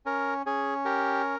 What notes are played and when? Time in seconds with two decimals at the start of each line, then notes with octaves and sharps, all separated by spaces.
0.06 C#4 A#4
0.46 C#4 G#4
0.85 G4 A#4